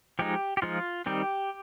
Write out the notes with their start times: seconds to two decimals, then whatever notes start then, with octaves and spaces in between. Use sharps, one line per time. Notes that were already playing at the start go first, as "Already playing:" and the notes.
0.19 F3 G#3 D#4 G4
0.57 G4
0.62 F3 G#3 D#4 F4
1.06 D#3 G3 C4 D#4 G4